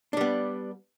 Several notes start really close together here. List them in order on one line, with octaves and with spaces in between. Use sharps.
D4 G3 B3